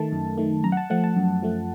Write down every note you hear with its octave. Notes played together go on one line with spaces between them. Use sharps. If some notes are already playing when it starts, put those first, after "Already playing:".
Already playing: D#3 A3 A5
F#2
D#3 A3
F#2 A#5
F#5
A5
F3 A3 F#5
A5
F#2
F3 A3